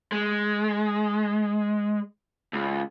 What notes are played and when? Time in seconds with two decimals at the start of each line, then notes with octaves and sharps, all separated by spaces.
0.12 G#3
2.53 C#2